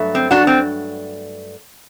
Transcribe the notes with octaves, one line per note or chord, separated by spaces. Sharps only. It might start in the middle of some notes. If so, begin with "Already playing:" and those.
Already playing: G2 F#3 A3
C4
D4 F#4
C4